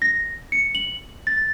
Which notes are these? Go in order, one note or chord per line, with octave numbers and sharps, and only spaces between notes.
A#6
C#7
F#7
A6